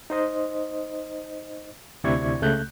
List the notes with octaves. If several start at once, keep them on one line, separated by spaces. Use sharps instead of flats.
D#4 C5 D#5
D2 C3 E4 D5 C#6 G#6
C#2 C#3 A3 F#6 G6